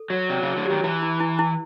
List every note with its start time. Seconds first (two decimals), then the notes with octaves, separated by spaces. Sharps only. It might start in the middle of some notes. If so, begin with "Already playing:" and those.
Already playing: A4
0.10 F#3 F#4
0.29 C3 D5
0.43 C#3 E4
0.57 D3
0.66 D#3 G4
0.84 E3 E4
1.02 E4
1.20 E4
1.39 E4